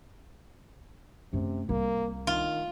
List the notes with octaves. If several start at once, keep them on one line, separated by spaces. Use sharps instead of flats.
F#2 C3 A3
C2 A#3
D#3 F4